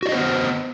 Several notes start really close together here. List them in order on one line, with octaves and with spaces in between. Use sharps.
F#4 D5 D#5 C5 B3